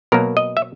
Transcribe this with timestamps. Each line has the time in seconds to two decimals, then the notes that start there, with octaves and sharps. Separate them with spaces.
0.12 B2 F#3 A#3 A#4
0.37 D#5
0.57 E5